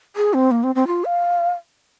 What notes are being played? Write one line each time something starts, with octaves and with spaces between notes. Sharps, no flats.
G#4
C4
A#3
C4
C4
F4
F5